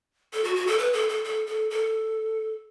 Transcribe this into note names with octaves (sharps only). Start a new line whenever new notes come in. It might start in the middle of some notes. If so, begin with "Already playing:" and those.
A4
F#4
F#4
A4
B4
A4
A4
A4
A4
A4